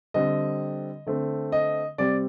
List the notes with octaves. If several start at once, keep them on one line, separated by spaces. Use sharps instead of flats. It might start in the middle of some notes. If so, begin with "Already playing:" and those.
D3 G3 C4 D#5
D3 A3 C4
D#5
C3 G3 C4 D5